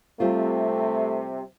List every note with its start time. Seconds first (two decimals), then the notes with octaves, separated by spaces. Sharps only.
0.20 C3 G3 A3 C4 F4